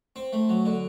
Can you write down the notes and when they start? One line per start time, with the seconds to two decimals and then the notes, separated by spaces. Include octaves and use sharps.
0.16 C4
0.33 A3
0.49 F#3
0.65 D3